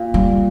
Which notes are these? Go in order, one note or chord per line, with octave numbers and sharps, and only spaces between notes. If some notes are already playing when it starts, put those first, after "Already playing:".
Already playing: A#2
G3